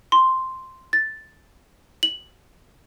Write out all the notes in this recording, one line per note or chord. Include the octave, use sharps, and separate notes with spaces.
C6
A6
F#7